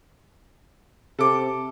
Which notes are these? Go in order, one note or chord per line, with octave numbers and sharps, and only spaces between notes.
C3 A4 D6